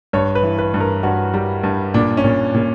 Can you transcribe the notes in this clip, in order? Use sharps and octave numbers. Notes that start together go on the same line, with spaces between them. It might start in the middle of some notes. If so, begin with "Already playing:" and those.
G2 C#5
B4
E3
B4
G2
A#4
G2 F#4
G3
G2
A#2 D4
C#4
A#2
A#2